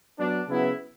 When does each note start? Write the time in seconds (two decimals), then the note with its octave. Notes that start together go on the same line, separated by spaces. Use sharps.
0.18 F#3 B3 D4
0.48 C#3 F#3 B3 E4